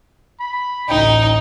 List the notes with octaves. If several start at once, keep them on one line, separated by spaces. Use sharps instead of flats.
B5
A1 D2 D#4 G5